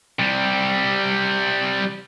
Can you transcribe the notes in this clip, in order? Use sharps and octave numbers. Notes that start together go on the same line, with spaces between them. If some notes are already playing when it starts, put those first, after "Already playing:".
C3 G3